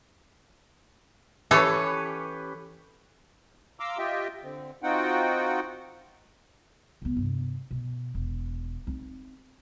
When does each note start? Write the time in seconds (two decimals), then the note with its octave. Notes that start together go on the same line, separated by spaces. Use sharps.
1.51 E3 C#4 G4 A4 B4 C#5
3.80 F5 A#5 C6 D6 E6
3.98 F4 G4 D#5 E5 G5
4.43 D3 C4
4.83 C4 D#4 F4 F#4 F#5 G5
7.02 F1 B3
7.16 G2 C3
7.71 B2
8.15 E1
8.87 C4 D#4